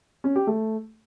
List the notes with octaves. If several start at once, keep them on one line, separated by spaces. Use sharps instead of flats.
C#4
G4
A3